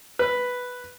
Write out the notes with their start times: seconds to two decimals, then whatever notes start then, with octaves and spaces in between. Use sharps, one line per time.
0.19 B4